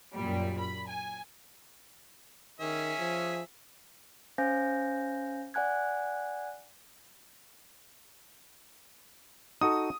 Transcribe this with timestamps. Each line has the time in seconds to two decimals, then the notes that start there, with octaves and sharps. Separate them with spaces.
0.14 F#2 A#2 G3
0.59 B5
0.88 G#5
2.60 D#3 C#4 G#4 E5
2.99 F3
4.38 C#4 C5 F5 G#5 G6 A#6
5.54 D5 F#5 G#5 F#6 G#6
9.61 D#4 F#4 A4 D#6